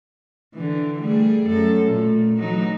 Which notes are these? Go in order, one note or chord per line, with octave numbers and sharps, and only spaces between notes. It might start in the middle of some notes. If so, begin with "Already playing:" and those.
D3 E3
G3 A3 G#4
F#2 A4
A#2 A3
E3 F#3 D#4